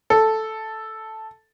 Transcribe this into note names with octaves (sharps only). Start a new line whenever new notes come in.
A4